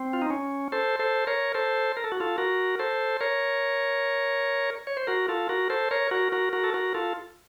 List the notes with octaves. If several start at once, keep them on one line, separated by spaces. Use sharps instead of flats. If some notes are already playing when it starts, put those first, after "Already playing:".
Already playing: C4
F4
D#4
C#4
A4 C5
A4 C5
A#4 C#5
A4 C5
A#4
A4
F#4
F4 A4
F#4 A#4
A4 C5
A#4 C#5
C#5
C5
F#4 A#4
F4 A4
F#4 A#4
A4 C5
A#4 C#5
F#4 A#4
F#4 A#4
F#4 A#4
A4
F#4 A#4
F4 A4